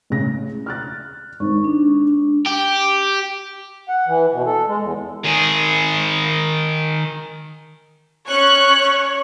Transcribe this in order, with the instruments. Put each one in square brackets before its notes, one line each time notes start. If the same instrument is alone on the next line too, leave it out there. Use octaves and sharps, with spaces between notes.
[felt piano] A1 C#3 A#6
F6 F#6 A6
[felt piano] G#1 D#4 [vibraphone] C#6
[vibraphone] D4
[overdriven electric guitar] G4
[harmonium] F#5
E3
B2
A4
G#3
E2
[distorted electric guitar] D#3 G#4
[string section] C#4 C#6 F#6 [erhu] C#5